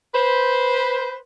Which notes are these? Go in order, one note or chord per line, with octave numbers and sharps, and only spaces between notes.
B4 C5